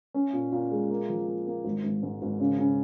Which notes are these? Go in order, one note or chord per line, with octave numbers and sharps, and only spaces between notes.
C#4
A#2
A#2
G#3
A#3
F3
A#3
A#3
G#1
G#1
G#2
G#1
C#3
C#3